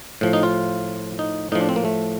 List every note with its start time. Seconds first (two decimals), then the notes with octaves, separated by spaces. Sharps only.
0.21 A2 F3
0.33 D#4
0.43 F4
1.19 D#4
1.52 A2 D#4
1.55 F3
1.61 D4
1.69 C4
1.76 A#3
1.85 A3